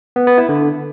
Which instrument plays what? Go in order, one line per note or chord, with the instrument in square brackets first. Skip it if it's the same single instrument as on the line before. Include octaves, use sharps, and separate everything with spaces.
[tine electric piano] B3
B3
E4
D3